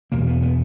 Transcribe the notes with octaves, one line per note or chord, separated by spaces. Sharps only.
E2 B2 A#3
B3
B3